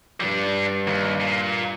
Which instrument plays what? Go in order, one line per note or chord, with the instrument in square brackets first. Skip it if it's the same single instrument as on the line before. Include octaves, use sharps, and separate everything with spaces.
[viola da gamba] G2 [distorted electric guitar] G3 D4
[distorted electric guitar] D#2
A#2